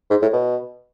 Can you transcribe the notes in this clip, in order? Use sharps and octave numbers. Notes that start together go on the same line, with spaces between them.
G#2
A2
B2